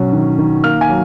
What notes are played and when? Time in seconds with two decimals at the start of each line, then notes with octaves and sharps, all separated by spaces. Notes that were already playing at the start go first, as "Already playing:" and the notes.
Already playing: B2 F#3 C#4
0.13 D#3
0.38 D#3
0.64 A#3 F6
0.81 G#5
0.89 F#3